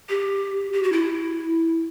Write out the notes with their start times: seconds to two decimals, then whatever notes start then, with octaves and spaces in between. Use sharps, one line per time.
0.09 G4
0.73 G4
0.83 F#4
0.92 E4